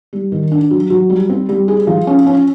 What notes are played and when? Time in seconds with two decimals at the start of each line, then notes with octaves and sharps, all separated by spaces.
0.13 G3
0.32 D#3
0.52 D4
0.71 F#3
0.90 F#3
1.10 G3
1.29 C4
1.49 G3
1.68 G#4
1.87 F3
2.07 C#4
2.26 C#4